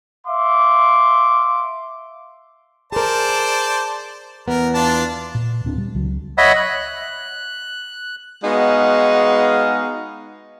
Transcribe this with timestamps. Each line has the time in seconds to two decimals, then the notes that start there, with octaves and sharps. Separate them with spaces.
0.27 E5 F5 C6 D6
2.92 G#4 A#4 C5 D5 A5
4.48 E2 B3 A#4
4.74 D4 F4 A5
5.35 A#2
5.65 D1 C4 D4
5.78 G3
5.95 C#2 F#3
6.38 C#5 D#5 E5 F#5 B5
6.56 F#6
8.44 G#3 B3 D#4 F#4 F5